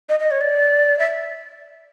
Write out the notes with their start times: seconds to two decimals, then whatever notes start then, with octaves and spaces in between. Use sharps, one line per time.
0.09 D#5
0.20 D#5
0.31 C#5
0.41 D5
0.99 E5